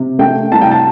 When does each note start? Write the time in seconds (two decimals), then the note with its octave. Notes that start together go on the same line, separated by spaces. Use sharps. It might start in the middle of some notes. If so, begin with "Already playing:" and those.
Already playing: C3
0.19 A3 G5
0.52 C2 A5
0.62 G5
0.72 A5